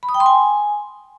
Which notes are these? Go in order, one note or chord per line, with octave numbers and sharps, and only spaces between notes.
B5
D#6
G5
C6
G#5